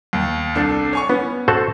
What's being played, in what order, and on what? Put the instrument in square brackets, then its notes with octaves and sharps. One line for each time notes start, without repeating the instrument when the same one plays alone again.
[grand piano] D#2
C2 D4 A4
C#5 G#5 C#6
[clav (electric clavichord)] B3 [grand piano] C#4
[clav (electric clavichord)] F#4 A4 C5